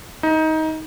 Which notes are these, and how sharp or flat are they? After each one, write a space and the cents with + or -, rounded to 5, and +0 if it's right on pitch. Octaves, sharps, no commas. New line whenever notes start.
D#4 +20